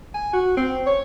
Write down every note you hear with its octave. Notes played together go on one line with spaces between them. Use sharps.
G#5
F#4
C4
C#5